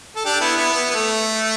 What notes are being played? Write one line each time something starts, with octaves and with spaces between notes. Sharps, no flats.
A4
D4 G4
B3 E4
B3 E4
B3
B3
A3